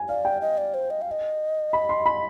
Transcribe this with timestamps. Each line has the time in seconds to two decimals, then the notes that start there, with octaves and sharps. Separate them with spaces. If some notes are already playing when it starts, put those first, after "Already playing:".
Already playing: G#5
0.09 D5 F5
0.25 G5
0.41 D#5
0.58 D5
0.74 C5
0.90 D#5
1.02 F5
1.11 D#5
1.73 B5
1.89 C6
2.06 B5